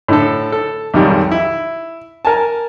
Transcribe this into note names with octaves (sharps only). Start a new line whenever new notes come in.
A2 D3 A4
A4
B1 F2 G#2 D#3 G3
E4
A#4 G#5 A5